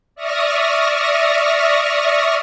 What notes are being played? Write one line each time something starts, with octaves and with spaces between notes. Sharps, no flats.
D5 E5 C#6 D#6 F6 A#6